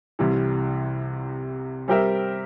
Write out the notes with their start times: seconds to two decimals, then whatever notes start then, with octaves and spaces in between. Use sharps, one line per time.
0.19 C2 C3 E3 G3
1.88 G3 C4 G4 A#4 E5